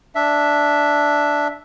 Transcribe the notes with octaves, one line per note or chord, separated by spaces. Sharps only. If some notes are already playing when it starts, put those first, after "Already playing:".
D4 E5